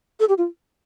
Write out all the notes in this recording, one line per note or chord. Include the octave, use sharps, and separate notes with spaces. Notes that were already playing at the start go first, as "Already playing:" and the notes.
A4
G4
F4